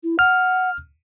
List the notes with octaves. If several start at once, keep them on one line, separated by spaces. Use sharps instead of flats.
E4
F#5 F6